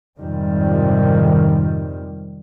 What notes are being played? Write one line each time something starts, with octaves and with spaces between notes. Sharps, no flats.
F2 G#2 C3 D#3 G3